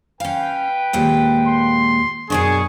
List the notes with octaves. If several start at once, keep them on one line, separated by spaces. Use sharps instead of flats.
C#4 B4 F5 G5
D#2 A#2 G#3
C6
F#2 B2 D4 G#4 G#5 C#6